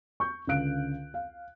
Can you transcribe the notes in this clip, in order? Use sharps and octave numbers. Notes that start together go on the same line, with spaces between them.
C#6 G6
C#2 D3 F5 F#6 D7
F5